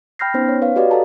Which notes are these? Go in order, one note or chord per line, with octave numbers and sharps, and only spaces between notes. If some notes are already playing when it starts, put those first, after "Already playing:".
G5 B5 F6 G6 A#6 C7
B3 C#4 D#4 C5
C#5
B4 C#5 F5
F#4 G4 B4 D5 D#5 F5
A4 F#5 A5 A#5